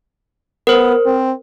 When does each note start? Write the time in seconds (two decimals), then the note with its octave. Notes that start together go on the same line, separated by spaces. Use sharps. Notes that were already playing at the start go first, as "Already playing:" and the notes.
0.67 B3 A#4 C5
1.06 C4